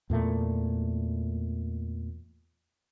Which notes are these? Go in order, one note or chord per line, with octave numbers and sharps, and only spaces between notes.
E2 A#2 A3